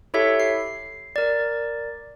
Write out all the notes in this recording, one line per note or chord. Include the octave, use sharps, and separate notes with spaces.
E4 G4 A4 C#5 E5
C7
A#4 D5